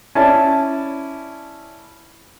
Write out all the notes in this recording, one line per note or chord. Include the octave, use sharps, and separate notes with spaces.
C#4 E4 D5 A5